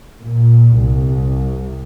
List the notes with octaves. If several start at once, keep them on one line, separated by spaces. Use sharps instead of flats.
A#2
C2